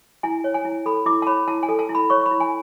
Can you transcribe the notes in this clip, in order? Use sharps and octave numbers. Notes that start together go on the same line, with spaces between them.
E4 G#5
C#5
G#5
E4
A4 B5
E4 D6
A5
C#5 B5
E4 A5
G#5
A4
A5
E4
B5
C#5 C#6
B5
E4
G#5